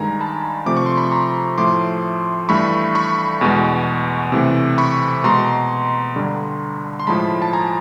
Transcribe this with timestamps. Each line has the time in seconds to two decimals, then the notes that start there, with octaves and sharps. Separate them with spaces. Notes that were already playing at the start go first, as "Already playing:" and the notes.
Already playing: G2 D#3 G#3 G#5 A#5
0.21 A5 B5
0.66 C3 F3 A3 D6
0.77 C#6
0.86 C6
0.97 B5 C#6
1.12 A#5 C6
1.58 A2 F3 A3 C6 D6
2.49 G2 E3 A3 B5 C#6
2.95 B5 C#6
3.41 E2 B2 G#3
4.32 C3 E3 A3
4.78 B5 C#6
5.24 B2 G#3 A#5 C6
6.16 G2 D3 G3
7.00 C6
7.07 A2 F3 G#3 A5 B5
7.42 A5
7.53 G#5 A#5